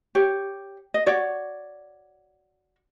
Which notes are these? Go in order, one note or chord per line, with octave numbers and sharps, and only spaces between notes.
G4 C#5
D#5
F#4 C#5 D5